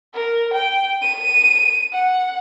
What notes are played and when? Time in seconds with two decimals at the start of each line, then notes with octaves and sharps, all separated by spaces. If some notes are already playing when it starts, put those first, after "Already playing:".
0.15 A#4
0.54 G5
1.02 D#7
1.93 F#5